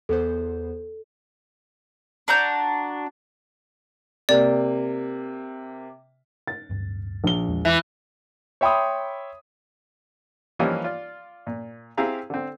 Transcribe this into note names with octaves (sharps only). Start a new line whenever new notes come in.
E2 B3 A4 C5
D4 F#4 A#5 G6
C3 A#3 D5
A6
D1 G2
A#1 G7
E2 G#3
E3
C#5 E5 G5 B5 C6 D#6
E3 F3 G3 A#3 C#4 D#4
F4 D5
A#2
C4 E4 G4 G#4 F5 A#5
D3 C4